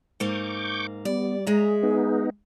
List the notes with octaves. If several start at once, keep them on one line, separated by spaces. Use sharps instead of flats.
G#2 A#3 C#6 D6 G6
G3 B3 D5
G#3 G#4 E5 A#5
B3 D#4